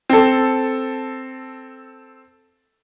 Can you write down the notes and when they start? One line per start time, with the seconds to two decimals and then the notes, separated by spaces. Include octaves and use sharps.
0.09 C4 A4